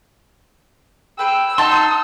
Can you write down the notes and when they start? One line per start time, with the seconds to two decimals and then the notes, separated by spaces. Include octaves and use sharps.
1.19 G#4 B4 G5 E6
1.58 D#4 F#5 A5 C6